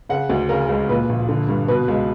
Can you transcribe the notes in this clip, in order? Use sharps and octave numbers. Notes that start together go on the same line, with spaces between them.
C#3 F#5
D2
C#3 A#4
C#2
A#2 B4
A#1
D3
G2
B2 B4
C#2